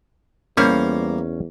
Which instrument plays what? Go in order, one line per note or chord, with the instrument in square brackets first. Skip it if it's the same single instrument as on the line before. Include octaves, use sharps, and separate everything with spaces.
[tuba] E2 [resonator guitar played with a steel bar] G3 C5 F5 [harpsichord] A#3 [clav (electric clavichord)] C#4